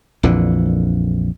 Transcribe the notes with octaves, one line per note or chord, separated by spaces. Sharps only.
A#1 F2 D3 E3